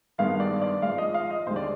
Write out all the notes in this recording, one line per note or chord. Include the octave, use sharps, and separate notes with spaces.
G2 D#3 G#3 B3 F5
D5
D5
G#2 F3 G#3 F5
D#5
F5
D#5
D#2 D3 G#3 C5
D5